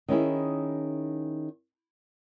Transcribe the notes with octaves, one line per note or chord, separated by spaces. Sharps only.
D#3 C#4 E4 G#4